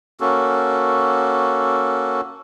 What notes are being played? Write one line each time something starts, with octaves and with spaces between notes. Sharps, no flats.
A#3 C#4 F#4 A4